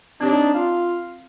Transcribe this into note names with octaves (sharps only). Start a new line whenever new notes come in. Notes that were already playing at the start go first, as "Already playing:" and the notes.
C4 D4 D#4 G4 C#5
F4 F5